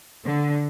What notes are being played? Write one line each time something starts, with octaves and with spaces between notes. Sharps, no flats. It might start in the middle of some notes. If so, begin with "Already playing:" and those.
D3